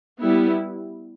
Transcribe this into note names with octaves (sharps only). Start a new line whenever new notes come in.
G3 B3 E4